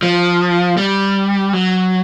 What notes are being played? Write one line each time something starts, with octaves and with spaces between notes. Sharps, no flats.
F3
G3
F#3